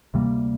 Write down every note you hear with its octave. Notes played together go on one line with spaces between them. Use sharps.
D2 C3 G3 A#3